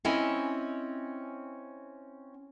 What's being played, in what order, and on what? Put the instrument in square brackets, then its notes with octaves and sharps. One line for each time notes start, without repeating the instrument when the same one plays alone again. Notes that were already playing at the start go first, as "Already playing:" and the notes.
[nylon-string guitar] C4 C#4 E4 D#5 G#5